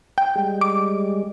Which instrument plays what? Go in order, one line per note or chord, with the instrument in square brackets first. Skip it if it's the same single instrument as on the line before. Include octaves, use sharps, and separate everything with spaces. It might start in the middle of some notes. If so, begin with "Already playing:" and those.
[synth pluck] G5
[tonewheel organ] G3 G#3
[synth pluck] D6